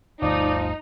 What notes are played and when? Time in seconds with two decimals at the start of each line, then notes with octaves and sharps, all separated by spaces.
0.22 G1 D2 F3 D#4 D5